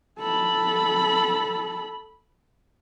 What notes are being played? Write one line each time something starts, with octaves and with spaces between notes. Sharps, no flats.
A4 B5